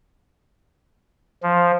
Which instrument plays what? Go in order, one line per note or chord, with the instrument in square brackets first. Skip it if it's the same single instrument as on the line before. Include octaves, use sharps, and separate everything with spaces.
[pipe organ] F3